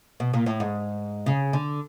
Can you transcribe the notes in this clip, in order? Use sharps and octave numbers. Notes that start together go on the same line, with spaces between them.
B2
A#2
A2
G#2
C#3
D3